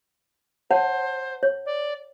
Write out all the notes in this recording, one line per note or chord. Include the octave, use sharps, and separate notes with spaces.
C5 C#5 F#5 A5
C#5
D5